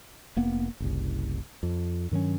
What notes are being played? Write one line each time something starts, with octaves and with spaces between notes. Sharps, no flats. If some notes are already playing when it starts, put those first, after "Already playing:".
F1 A#3 B3
F#1 C2
F2
G2 D#3 F#3 C#4